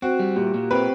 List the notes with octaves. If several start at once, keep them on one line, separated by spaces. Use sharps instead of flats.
C4 F#4
G3
A#2 G4
A#2
C4 B4